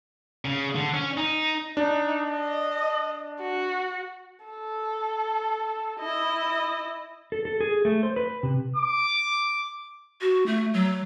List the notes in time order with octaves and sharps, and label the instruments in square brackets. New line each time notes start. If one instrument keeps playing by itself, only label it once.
[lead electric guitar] C#3
D3
C#4
D#4
[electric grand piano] D4 [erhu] D#4
[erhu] D#5
F#4
[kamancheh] A4
E4 D#5
[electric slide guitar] A4
A4
G#4
A3
C5
B4
C3
[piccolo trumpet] D6
[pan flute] F#4
A3
F#3